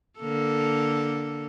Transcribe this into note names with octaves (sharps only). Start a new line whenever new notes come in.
D3 A#3 A4